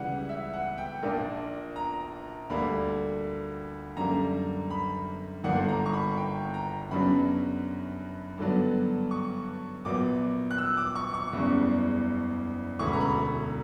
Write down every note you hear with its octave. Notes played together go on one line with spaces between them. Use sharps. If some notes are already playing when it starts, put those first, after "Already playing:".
Already playing: C#2 C#3 E3 G3 F#5
E5
F#5
G5
A#1 A#2 A#3 D4
A#5
D2 D3 G3 A#3 B5
F#2 D3 G3 A#3 A#5
B5
G1 G2 D3 A#3 D4 F#5
A#5
C#6
B5
G5
A#5
F#2 C#3 F#3 B3 D4 B5
G2 D3 F#3 B3 D4
C#6
A#1 A#2 F#3 B3 D6
F#6
E6
D6
C#6
C#6
F#1 E2 C#3 G3
E1 D2 C#3 E3 C#6
B5
A#5
B5